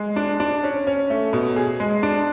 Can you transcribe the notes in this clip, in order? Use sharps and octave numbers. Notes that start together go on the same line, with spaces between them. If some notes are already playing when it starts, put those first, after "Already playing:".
Already playing: G#3
D4
D4
C#4
C#4
A3
B2
G#4
G#3
D4